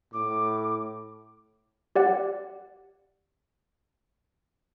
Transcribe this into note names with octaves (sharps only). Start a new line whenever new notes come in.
A2 D6
G4 D5 F#5